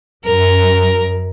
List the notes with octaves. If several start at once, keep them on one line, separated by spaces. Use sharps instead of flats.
F#2 A#4